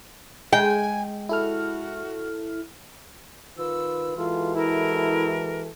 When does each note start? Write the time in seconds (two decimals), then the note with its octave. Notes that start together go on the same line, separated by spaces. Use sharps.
0.53 G#3 G5 G#5
1.29 E4 F#4 A4 F6
3.58 D#3 F4 B4 E6
4.17 E3 G#3 F4 F#4 A4
4.55 E4 A#4